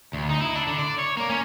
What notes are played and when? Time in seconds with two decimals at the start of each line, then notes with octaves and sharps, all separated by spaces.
0.13 D2
0.29 D#4
0.41 E4
0.55 D4
0.67 D3
0.78 D5
0.99 C#5
1.17 A#3
1.29 C#4